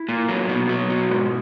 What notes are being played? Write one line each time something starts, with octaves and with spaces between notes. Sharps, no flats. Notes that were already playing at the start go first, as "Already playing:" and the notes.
Already playing: E4
A#2
F#3
B2
F#3
B2
G#2